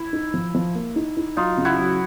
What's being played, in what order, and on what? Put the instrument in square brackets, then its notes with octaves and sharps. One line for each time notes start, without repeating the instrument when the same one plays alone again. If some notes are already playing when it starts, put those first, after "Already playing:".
Already playing: [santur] E4
[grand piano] D#4
F3
F3
A#3
D#4
D#4
[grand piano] F#3 [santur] D#4 F4
[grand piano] C#3
[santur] E4 F#4
[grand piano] F#3